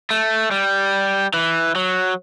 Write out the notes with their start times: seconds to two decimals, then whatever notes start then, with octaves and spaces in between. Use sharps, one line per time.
0.11 A3
0.51 G3
1.34 E3
1.75 F#3